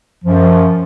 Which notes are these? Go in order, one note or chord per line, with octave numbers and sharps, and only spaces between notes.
F#2 F3